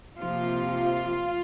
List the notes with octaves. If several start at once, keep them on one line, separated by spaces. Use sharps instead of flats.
C3 F3 A#3 F4